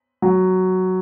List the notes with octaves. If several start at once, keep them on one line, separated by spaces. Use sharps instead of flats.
F#3